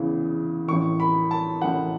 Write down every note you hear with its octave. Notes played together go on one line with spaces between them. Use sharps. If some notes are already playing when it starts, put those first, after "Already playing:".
Already playing: E2 C#3 E3
A1 A2 E3 C#6
B5
A5
A1 A2 E3 F#5